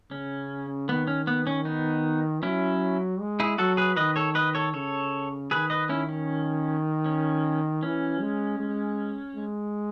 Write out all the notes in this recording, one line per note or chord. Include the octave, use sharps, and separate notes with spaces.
C#3 C#4
D#3 B3
C#4
B3
C#4
B3 D#4
F#3 C#4 E4
G#3
E4 G#4
F#3 F#4 A4
G#4 B4
D#3 B4 D#5
A4 C#5
B4 D#5
A4 C#5
C#3 A4 C#5
D#3 G#4 B4
B4 D#5
C#4 E4
C#4
C#4
E3 C#4
G#3
G#3
G#3